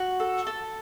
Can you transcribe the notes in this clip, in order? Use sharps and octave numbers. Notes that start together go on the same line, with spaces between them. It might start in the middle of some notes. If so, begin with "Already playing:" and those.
Already playing: F#4
A4
A4